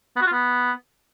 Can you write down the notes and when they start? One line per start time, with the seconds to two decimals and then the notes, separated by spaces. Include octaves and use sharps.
0.16 B3
0.22 F#4
0.27 F4
0.32 B3